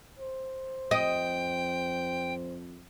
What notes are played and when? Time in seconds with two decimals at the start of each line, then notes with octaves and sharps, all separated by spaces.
0.19 C5
0.91 F2 D#5 G5